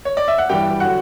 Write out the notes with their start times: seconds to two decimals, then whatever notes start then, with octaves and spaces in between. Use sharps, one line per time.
0.05 C#5
0.17 D5
0.28 E5
0.38 F#5
0.49 G2 E3 G3 G4 G5
0.80 D3 F#3 F#4 F#5